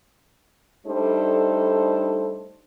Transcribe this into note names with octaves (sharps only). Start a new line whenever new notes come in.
G3 A3 D4 D#4 A4 C5